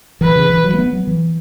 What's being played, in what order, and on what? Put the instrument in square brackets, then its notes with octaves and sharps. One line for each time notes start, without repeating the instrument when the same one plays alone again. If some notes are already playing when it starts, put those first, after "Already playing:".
[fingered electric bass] E3 [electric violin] B4
[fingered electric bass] C#3
E3
F#3
A3
B3
F#3
E3